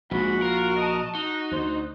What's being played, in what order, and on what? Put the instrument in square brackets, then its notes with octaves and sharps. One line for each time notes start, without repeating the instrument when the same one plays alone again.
[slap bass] A#1 [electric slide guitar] G#2 [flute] F#4 [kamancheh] B5
[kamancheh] F4 [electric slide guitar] A#4
[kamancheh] D#5 A5
[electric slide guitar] D#4 [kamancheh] F#4
[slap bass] D2 [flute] C5